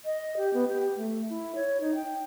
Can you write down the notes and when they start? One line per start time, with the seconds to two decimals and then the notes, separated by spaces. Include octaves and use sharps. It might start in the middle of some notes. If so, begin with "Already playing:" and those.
0.05 D#5
0.37 G4
0.54 B3
0.68 G4
0.96 A3
1.29 E4
1.55 C#5
1.81 D#4
1.95 G5